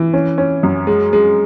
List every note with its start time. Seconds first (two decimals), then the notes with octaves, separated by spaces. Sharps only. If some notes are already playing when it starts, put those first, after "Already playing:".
Already playing: E3
0.13 C#4
0.38 C#4
0.63 F#2
0.87 G#3
1.13 G#3